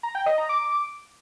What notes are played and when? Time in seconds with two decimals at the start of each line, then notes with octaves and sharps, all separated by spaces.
0.03 A#5
0.15 G5
0.26 D#5
0.38 A#5
0.49 D6